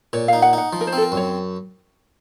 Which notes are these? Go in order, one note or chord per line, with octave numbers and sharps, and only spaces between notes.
A#2 C#5
D#4 F5
F#5
D#4 F#5
F3
A#4
C5
C4 A4
A#4
F#2
C#5